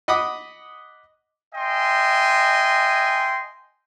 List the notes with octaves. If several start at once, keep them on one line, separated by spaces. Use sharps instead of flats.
D#5 F#5 B5 D6 D#6
D#5 E5 G5 G#5 C6